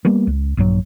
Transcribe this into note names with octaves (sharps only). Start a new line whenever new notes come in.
G3 A#3 B3
C#2
A#1 G2 C#3 F#3